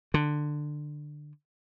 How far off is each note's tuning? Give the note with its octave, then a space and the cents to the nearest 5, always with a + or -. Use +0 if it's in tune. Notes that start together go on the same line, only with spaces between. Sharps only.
D3 +15